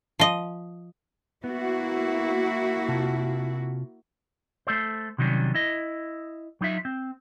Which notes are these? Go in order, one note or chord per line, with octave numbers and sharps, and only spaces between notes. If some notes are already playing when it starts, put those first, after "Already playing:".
F3 D#5
A#3 B3 E4 F#4
C3 F4 A5
A3 A4 C5
C3 D#3 F#3 G3 C#4
E4 D#5
F#3 D#4 F4 E5
C4